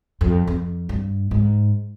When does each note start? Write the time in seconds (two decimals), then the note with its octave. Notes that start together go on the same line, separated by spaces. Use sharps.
0.21 F2
0.47 F2
0.89 G2
1.31 G#2